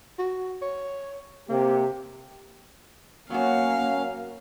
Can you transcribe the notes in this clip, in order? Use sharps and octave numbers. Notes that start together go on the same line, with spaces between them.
F#4
C#5
C3 A#3 G4
F#3 A#3 B3 C#4 F#4 F5